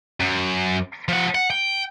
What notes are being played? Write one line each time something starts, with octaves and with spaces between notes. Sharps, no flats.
F#2
F3 F#5
F#5
G5